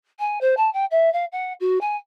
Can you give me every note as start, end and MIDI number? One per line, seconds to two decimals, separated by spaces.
0.19 0.38 80
0.41 0.55 72
0.57 0.71 81
0.73 0.85 79
0.91 1.11 76
1.13 1.25 77
1.32 1.53 78
1.60 1.79 66
1.81 1.96 80